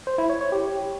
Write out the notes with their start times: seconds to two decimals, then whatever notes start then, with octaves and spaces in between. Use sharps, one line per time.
0.07 C5
0.18 E4
0.30 C#5
0.41 C#5
0.52 G4